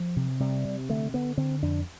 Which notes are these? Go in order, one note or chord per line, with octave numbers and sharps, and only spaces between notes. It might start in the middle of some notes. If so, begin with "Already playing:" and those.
Already playing: F3
C3
C3 G3
C3
D3 A3
D3 B3
D3 C4
F2 D4